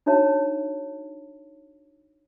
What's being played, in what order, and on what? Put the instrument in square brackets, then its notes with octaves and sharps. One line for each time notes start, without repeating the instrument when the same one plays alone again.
[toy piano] D4 D#4 F#4 C#5 E5 A5